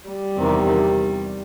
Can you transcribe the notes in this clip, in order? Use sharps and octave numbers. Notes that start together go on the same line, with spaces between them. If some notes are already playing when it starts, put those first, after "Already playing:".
G3
E2 C3 D#3